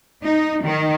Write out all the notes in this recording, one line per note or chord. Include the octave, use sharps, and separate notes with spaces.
D#4
D#3